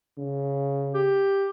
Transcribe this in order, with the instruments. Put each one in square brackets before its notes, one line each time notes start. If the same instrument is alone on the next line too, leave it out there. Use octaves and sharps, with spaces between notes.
[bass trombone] C#3
[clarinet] G4